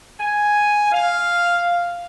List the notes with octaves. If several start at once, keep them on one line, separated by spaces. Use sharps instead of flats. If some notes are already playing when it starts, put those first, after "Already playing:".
G#5
F5